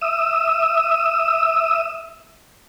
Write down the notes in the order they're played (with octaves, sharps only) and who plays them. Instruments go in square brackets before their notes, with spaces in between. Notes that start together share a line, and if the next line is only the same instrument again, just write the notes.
[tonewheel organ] E5 D#6 E6